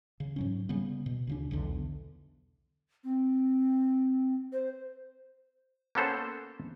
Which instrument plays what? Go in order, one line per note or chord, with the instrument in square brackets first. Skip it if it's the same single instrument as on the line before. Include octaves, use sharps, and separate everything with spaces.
[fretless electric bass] C#3
G#2 F#3 C#4
C#3 G3 B3
B2
D2 C#3 D4
B1 E2 D3
[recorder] C4
C5
[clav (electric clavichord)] A#3 B3 C#4 A4 C5